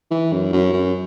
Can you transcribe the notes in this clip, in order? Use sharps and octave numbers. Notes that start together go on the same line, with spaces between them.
E3
F#2
F#2
F#2